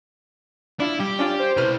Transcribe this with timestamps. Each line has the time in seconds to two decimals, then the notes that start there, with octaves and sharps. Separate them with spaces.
0.80 D4 E4 F4
1.00 G3 G4
1.19 C#4 D4 F4 D5
1.40 C5
1.57 C3 E4 B4 G5 F6